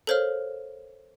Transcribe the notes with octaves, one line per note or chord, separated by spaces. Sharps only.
A4 A#4 C5 C#5 F5 F6